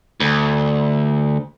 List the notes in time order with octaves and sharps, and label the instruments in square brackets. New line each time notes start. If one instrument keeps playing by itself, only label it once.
[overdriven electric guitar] D2